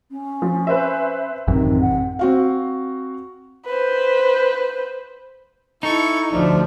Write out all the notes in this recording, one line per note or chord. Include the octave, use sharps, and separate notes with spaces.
C#4
F3
B4 C5 E5
A1 F#2 C3 D#3 E3
F#5
C4 F#4 F5
B4 C5
D#4 E4 A4 C#6
D2 F3 A3 D4